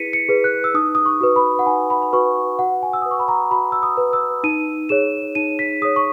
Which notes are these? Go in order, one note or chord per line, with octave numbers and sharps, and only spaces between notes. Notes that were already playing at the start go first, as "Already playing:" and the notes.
Already playing: E4 G#4 B4 B6 C#7 D#7
C#7
G#4 B4
F#6
E6
D#4 D#6
D#6
C#6
F#4 B4
B5
F#5
D#4 G#5
B5
B5
F#4 B4 C#6
F#4 F#5
G#5
E6
B4 D#6
C#6
B5
A#5
F#4 B5
E6
D#6
B4
E6
D#4 D#7
G#4 C#5 E7
D#4 D#7
B6
G#4 C#5 D#6
C#6